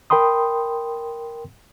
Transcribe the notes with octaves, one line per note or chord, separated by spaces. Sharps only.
A#4 G5 B5 C6 D#6